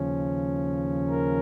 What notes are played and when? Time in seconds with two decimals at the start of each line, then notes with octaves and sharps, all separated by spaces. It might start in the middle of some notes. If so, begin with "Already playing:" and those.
Already playing: D#2 C#3 F3 C#4
1.09 A#4